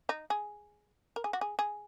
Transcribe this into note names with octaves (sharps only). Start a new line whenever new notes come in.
D#4
G#4
A#4
G#4
F#4
G#4
G#4